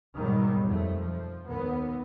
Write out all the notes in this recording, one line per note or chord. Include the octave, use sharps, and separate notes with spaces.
D#2 G#2 B2 D#3 F#3 G3
F2 A3
F3
D#2 B3